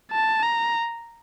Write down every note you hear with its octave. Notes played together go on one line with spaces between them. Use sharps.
A5
A#5